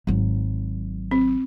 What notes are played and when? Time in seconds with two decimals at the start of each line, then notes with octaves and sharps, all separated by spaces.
0.07 G#1 F#3
1.11 C4